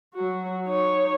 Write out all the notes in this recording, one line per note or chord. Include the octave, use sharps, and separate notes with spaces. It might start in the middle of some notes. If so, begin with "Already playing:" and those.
F#3 F#4
D#4 C#5